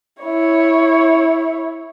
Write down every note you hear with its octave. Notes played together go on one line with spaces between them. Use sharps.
E4 C#5